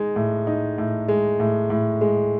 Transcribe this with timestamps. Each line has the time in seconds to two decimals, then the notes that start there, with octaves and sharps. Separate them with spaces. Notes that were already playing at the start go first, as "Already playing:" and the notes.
Already playing: G#3 D#4
0.16 A2
0.47 D#4
0.78 A2
1.08 G#3
1.40 A2
1.70 A2
2.01 G#3